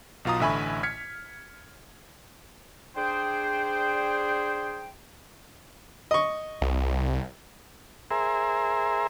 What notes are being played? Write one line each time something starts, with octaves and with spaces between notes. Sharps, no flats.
B1 B2 F4 A#5 D#6
A1 D3 E5 G#5 B5 C#6
F6 G#6 B6 C#7
D4 G#4 C5 G5
D#5 C#6
C2
G#4 A#4 C5 E5